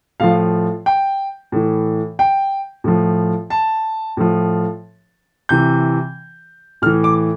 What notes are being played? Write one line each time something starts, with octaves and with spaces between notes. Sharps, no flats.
A2 F3 F5
G5
A2 E3
G5
A2 F3
A5
A2 F3
C3 E3 G6
A2 E3 F6
D6